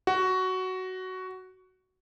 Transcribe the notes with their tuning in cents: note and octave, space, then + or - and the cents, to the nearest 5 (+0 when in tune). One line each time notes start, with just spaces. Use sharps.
F#4 +10